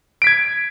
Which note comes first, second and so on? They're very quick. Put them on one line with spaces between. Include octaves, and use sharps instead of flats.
D7 B6 G#6